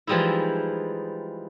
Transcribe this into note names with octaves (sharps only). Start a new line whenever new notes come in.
E3 F3 G3 G#3 D#4 E4